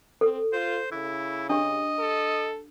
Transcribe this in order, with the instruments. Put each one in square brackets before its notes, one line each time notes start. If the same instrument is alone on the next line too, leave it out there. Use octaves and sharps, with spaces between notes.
[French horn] C4 [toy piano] A4
[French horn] F4 [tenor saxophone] C5
[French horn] C#3 [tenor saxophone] E4
[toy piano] D4 G4 [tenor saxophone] D#5
[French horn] A4